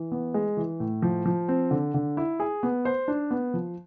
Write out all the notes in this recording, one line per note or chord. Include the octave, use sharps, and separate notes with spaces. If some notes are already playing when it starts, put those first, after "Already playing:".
Already playing: E3
B3
G#3
E3
A2
F3
F3
C4
D3
D3
E4
G#4
B3
C5
D4
B3
F3